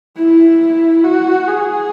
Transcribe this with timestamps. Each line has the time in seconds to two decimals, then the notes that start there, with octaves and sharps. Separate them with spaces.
0.16 E4
1.04 F#4
1.47 G#4